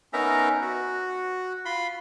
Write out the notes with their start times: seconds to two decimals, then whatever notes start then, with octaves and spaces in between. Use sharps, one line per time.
0.13 B3 C#4 D#4 A#4 E5 A#5
0.62 F#4
1.65 F4 B5 C6